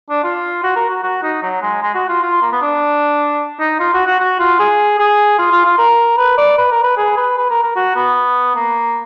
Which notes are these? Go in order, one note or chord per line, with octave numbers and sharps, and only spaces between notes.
D4
F4
F#4
A#4
F#4
F#4
D#4
F#3
G#3
G#3
F#4
F4
F4
A#3
B3
D4
D#4
F4
F#4
F#4
F#4
F4
G#4
G#4
F4
F4
F4
A#4
B4
D5
B4
A#4
B4
G#4
B4
B4
A#4
A#4
F#4
B3
A#3